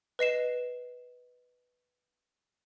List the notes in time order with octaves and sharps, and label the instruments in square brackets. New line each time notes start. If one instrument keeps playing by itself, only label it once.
[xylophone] B4 D#5 C7 E7